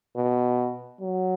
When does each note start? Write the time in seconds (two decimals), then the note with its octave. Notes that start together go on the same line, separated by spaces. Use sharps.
0.16 B2
1.01 F#3